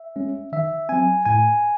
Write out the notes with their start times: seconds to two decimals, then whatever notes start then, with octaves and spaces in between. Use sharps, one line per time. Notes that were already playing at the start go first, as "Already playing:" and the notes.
Already playing: E5
0.16 G#3 C#4
0.52 D#3 E5
0.89 F#3 C4 G#5
1.25 A2 G#5